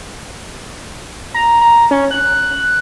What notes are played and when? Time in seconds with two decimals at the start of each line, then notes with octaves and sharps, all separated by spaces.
1.34 A#5
1.61 A#5
1.91 C#4
2.11 F#6